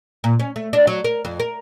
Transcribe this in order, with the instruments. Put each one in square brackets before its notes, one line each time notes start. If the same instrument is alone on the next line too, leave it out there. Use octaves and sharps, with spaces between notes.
[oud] A#2
C#4
A3
D4
F#3
A#4
F2
A#4